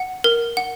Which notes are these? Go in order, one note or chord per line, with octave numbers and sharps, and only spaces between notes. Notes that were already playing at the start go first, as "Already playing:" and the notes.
Already playing: F#5
A#4
F#5